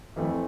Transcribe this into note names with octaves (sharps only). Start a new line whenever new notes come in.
F2 E3 A3 C4